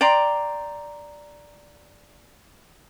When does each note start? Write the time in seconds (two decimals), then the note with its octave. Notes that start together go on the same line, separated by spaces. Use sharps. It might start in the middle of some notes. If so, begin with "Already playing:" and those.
0.01 D5 G5 A#5 C6